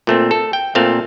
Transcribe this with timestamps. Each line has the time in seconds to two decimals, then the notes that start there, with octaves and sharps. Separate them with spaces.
0.07 A#2 A3 C4
0.31 A4
0.53 G5
0.75 A#2 A3 C4 F5